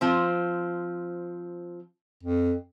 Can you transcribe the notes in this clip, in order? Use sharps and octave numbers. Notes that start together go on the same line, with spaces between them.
F3 C4
F2